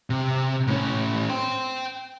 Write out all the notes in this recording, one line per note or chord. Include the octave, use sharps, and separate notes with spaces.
C3
A2 C#4
G5 C6